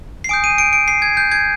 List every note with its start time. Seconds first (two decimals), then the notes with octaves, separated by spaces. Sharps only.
0.24 C7
0.29 G#5 D#6 G6 D7
0.44 D#7
0.58 D7
0.73 D7
0.88 C7
1.02 G#6
1.17 G6
1.32 G#6